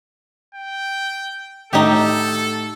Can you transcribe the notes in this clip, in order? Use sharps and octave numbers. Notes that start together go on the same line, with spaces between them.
G5
A2 D#4 F#4 G4 A4